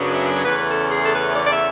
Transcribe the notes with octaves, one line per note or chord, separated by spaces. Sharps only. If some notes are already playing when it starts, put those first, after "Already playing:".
Already playing: F#2 C#3 F#3 B3 D4
E5
C#5
E2 C#3 E3 A3 C#4 B4
A4
G#4
A4
B4
D5
D5
E5